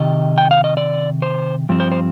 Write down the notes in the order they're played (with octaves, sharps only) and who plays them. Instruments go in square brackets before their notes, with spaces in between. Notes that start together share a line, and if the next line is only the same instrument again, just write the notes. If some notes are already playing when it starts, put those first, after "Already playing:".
Already playing: [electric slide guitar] C3 D#3 D#5
G5
F5
D#5
D5
C5
G2 F3 C4
C5
C5